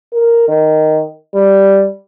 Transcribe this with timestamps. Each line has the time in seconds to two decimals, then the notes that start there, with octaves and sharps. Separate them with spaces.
0.13 A#4
0.48 D#3
1.34 G3